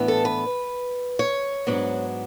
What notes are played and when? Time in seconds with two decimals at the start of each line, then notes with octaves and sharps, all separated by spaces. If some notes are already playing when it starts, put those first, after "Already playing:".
Already playing: A2 E3 B3 D4
0.08 A4
0.25 B4
1.19 C#5
1.67 G#2 F#3 B3 D4